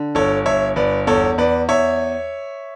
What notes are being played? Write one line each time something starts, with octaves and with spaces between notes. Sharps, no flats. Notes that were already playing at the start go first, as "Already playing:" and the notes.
Already playing: D3
G1 A4 C#5
G1 C#5 E5
G1 B4 D5
E2 A4 C#5
E2 B4 D5
E2 C#5 E5